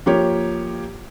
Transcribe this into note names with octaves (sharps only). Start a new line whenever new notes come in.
F3 A#3 G4 C#5